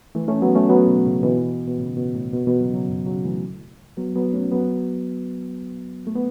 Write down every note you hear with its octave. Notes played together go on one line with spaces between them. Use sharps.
E3 A3
A3 C#4
F#3 B3
A3 C#4
F#3 B3
B2
A2 C#3
B2 E3
B2
A2 C#3
B2
A2
B2
B2 E3
C#3 F#3
C#3 F#3
F#2
C#3 F#3
E3 A3
F#3 B3
F#3 B3
A3 C#4
F#3 B3
A3
B3